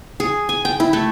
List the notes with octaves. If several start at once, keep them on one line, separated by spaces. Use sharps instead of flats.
G#4
G#5
G5
E4
A3